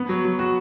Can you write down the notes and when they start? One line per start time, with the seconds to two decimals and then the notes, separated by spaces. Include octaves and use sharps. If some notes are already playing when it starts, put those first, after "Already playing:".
Already playing: B3
0.09 F#3
0.25 F#3
0.39 F#4